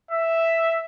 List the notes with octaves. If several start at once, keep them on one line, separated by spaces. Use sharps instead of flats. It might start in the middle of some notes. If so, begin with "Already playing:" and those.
E5